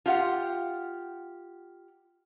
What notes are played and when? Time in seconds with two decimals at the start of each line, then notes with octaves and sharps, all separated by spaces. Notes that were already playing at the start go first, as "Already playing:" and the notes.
0.06 F4 G4 F5 F#5